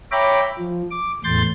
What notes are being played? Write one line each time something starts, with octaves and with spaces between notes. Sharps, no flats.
C#5 E5 G5 A#5 B5 D6
F3
D6
E2 A2 C6 G6 A6